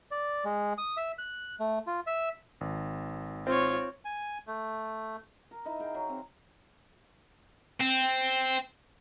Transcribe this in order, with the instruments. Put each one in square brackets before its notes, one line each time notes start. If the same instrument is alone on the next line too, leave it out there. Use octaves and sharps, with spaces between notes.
[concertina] D5
G#3
D#6
E5
F#6
A3
F4
E5
[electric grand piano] G#1
[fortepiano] C4 [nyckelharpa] F4 C#5
[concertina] G#5
A3
[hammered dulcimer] A#4
D#4 E4 D#5 E5
G#4 F5 G5
F#3
C4
[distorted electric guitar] C4